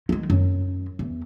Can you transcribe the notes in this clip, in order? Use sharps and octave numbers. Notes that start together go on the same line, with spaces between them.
D#3 G#3
F#2
E2